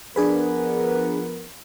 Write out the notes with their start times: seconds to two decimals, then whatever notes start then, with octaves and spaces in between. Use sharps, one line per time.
0.16 F3 B3 D4 G#4 A#4 B4